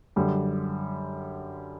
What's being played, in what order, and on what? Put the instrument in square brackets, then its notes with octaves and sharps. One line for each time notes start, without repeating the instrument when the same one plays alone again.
[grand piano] F#2 D3 G3